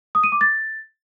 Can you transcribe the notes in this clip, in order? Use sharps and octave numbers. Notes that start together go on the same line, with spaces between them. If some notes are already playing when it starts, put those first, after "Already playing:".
D#6
D#7
D6
A6